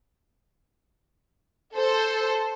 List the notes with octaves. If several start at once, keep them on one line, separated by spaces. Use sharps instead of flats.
A4 C5